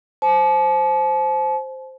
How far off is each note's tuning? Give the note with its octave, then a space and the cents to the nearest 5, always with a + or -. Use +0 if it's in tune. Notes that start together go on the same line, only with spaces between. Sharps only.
C5 +0 A5 -40